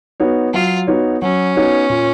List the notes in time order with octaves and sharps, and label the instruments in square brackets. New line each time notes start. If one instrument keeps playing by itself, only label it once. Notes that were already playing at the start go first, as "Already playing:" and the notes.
[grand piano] B3 D#4 F#4 C#5
[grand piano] F#3 [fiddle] F4
[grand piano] B3 D#4 F#4 C#5
[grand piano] F#3 [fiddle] C#4
[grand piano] B3 D#4 F#4 C#5
A#2